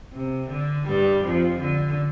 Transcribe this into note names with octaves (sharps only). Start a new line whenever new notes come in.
C3
D3
G2 G3
F2 F3
D3